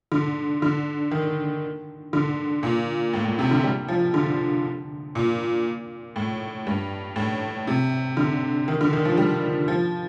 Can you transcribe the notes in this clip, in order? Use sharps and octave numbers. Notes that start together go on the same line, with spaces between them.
D3
D3
D#3
D3
A#2
A2
A2
C3
D3
G3
F3
D3
A#2
A2
G2
A2
C3
D3
D#3
D3
D#3
F3
G3
F3